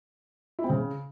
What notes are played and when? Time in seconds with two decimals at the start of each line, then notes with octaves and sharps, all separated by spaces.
0.59 E4
0.64 C4
0.70 C#3